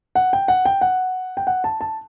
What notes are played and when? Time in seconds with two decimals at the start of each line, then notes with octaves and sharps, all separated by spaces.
0.15 F#5
0.33 G5
0.48 F#5
0.65 G5
0.81 F#5
1.37 G5
1.47 F#5
1.64 A5
1.81 A5